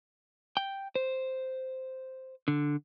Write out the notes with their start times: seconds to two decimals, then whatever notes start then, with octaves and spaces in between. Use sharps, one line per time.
0.57 G5
0.95 C5
2.48 D3